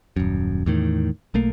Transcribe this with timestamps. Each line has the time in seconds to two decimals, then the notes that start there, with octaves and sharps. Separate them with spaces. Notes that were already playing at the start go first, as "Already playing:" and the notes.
0.16 D#1 F#2
0.66 E2 A2 D#3
1.34 B1 A3 A#3